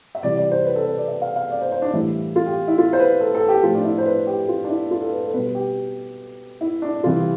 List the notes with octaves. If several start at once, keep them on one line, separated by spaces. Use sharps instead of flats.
E5
C3 E3 G3 D5
D5
C5
B4
A4
B4
D5
E5
F5
F5
D5
C5
C5
D4
A2 E3 G3 E4
F4
G4
E4
F4
C5
B4
A4
A4
G4
A2 F3 F4
D4
E4
C5
B4
G4
F4
D4
E4
F4
A4
B4
A4
B2 G3 B4
G4
E4
D4
C3 E3 G3 F4